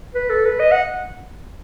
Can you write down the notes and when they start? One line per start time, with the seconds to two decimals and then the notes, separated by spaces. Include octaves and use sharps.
0.15 B4
0.30 A4
0.45 B4
0.60 D#5
0.71 F#5